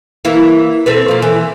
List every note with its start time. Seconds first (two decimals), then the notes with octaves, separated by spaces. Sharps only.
0.25 E3 A#3 E4
0.86 C4 A4 B4
1.08 F3 A#3
1.22 E3